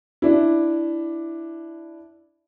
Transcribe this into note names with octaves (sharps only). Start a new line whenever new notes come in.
D4 E4